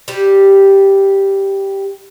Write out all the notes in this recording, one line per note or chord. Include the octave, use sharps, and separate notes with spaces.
G3 G4